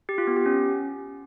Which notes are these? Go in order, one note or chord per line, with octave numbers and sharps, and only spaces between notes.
G4
F4
B3
G4
C#4